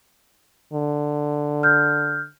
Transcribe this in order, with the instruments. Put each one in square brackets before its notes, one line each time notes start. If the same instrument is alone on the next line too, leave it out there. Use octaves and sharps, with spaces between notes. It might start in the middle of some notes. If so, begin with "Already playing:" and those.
[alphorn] D3
[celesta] F6 G6